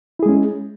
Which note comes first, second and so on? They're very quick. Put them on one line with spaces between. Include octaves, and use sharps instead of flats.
E4 G#4 G#3 C#4